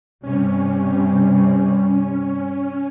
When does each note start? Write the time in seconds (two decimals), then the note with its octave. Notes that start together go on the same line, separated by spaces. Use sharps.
0.23 G2 C3 G3 C#4